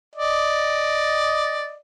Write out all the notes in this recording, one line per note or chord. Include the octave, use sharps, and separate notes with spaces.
D5 D#5